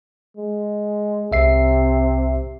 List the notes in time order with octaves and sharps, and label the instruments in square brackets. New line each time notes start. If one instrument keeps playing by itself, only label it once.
[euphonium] G#3
[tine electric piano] C2 E5 C7 [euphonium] C3